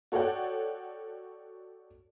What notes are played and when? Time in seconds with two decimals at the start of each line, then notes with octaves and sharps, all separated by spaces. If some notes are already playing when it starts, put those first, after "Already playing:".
0.12 F#4 A4 C#5 D5 F#5 G5